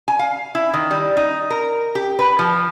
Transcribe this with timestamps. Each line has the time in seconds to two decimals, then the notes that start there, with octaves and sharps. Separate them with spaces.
0.08 G#5
0.19 F5
0.55 E4
0.74 D#3
0.91 G3
1.17 D#4
1.50 A#4
1.95 G4
2.19 B4
2.39 F3